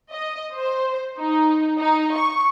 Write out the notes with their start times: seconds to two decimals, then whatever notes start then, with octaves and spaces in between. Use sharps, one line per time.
0.12 D#5
0.54 C5
1.18 D#4
1.78 D#4
2.16 C#6